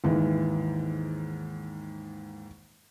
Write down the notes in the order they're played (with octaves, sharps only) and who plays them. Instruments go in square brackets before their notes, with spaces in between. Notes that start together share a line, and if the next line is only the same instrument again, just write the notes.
[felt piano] D#2 G#2 E3